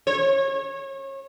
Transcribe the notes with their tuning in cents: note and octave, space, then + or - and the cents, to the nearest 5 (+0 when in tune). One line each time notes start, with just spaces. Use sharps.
C#5 -30